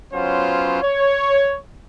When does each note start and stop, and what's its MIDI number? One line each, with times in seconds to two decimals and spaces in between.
0.13 0.79 54
0.13 0.79 59
0.13 0.79 61
0.13 0.79 65
0.13 0.79 72
0.82 1.59 73